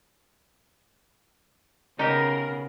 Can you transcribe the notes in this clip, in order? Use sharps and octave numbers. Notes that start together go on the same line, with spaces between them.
C#3 B3 D#4 G4 A#4